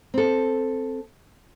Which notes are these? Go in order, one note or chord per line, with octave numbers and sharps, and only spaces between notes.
C4 A4